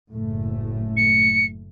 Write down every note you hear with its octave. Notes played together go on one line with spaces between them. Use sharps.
F#1 A2 A3
C#7